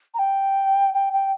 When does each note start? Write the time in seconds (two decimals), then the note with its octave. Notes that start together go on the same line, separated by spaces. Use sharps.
0.14 A#5
0.19 G5
0.94 G5
1.13 G5